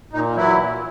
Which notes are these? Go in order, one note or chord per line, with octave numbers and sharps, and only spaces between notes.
A#2 D#4
E3 F#3 E4
A#2